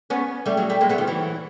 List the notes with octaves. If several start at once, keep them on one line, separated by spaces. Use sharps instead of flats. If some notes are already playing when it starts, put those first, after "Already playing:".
B3 C#4
G3 A3
F#3 G#3
G3 A3
G#3 A#3
A3 B3
D#3 F3
E3 F#3